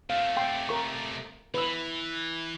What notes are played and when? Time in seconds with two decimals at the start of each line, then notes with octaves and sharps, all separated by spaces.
0.10 C3 A3 F5
0.37 G5 C6
0.69 A#4 C#6
1.54 E3 B4 E6